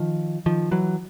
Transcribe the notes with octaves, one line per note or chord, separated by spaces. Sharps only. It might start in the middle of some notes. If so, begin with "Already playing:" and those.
Already playing: D#3 F3
D#3 F3
E3 F#3